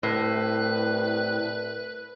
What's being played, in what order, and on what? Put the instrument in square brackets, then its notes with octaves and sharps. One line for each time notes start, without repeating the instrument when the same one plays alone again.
[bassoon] C2 [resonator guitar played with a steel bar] A2 [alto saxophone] B4